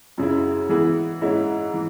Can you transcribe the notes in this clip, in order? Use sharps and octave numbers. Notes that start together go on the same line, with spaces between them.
F#2 C#3 G#3 E4
E3 B3 E4 G#4
G#2 G#3 C#4 E4
E3